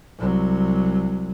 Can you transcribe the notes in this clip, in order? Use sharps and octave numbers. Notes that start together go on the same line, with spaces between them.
C2 F#3